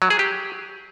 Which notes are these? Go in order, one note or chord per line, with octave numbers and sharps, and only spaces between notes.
F#3
G#4
G4